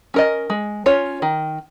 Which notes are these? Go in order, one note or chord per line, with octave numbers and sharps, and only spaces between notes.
C#4 A#4 D#5
G#3
C#4 F4 C#5
D#3